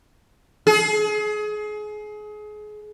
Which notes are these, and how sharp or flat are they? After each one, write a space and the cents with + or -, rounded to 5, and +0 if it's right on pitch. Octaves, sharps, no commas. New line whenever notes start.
G#4 +30